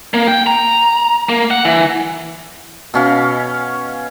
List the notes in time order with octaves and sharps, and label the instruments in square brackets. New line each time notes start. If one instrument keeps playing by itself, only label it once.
[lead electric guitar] A#3
G5
A#5
A#3
F#5
E3
[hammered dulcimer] B2 C#4 F5